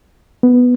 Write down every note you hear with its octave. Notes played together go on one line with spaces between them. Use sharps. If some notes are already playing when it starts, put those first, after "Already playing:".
B3